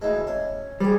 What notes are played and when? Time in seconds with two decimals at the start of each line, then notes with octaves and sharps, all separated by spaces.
0.02 D2 E3 G#3
0.27 C#4
0.80 G3 G#4 C5